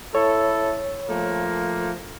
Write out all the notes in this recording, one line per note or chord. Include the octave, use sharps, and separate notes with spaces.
E4 A4 C#5
F3 A3 A#3